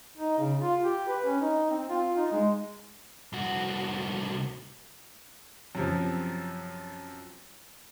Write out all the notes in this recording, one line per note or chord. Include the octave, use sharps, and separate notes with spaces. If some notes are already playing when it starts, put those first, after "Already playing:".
D#4
C#3
F4
G4
B4
C#4
D#4
C4
F4
D#4
G#3
C2 F#4
F#2 C3 F3